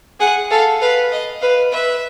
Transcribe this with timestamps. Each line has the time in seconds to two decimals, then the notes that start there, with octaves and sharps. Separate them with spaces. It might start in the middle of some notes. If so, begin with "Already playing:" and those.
0.20 G#4 F#5
0.51 A4 F5
0.81 B4 F5
1.12 D#5
1.42 B4 F5
1.73 B4 E5